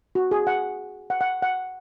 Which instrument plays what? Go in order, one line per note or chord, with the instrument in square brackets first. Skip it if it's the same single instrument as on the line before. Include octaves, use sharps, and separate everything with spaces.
[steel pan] F#4
G#4
F#5
F#5
F#5
F#5